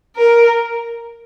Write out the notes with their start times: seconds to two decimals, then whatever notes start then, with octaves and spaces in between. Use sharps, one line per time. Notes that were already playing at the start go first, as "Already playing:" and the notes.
0.16 A#4